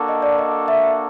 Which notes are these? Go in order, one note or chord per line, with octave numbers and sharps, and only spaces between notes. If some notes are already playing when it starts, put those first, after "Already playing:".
Already playing: A#3 D4 F#4 A4
D#5
D5
D#5
E5